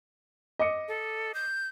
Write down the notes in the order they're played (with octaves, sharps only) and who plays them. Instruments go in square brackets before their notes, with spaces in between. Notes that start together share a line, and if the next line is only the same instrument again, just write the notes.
[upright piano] D#5 D6 C#7
[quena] A4
G6